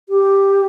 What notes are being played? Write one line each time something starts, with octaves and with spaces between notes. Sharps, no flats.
G4